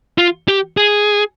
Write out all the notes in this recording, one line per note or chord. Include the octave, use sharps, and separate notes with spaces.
F4
G4
G#4